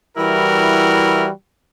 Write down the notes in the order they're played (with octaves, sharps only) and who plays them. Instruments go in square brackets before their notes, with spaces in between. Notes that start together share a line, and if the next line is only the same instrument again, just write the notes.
[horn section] E3 G3 E4 F#4 A#4